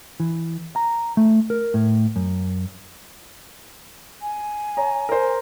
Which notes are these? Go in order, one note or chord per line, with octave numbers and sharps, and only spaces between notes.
E3
A#5
A3
A#4
A2
F#2
G#5
C#5 A#5
A#4 C5